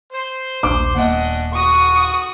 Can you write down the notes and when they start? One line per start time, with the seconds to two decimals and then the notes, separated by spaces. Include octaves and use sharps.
0.12 C5
0.63 D#1 A#1 D4 D6
0.95 D#1 A#3 B3 C#4 D4 D#5 F#5
1.52 F#4 C#6 D#6